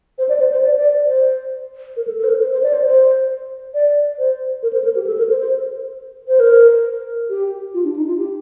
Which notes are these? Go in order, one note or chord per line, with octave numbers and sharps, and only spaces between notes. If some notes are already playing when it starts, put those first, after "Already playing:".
C5
D5
C5
C5
D5
D5
C5
A#4
A4
A4
C5
A#4
C5
C5
D5
C5
C5
D5
C5
A#4
C5
A#4
G4
A4
A#4
C5
C5
C5
A#4
G4
F4
D4
D#4
F4
G4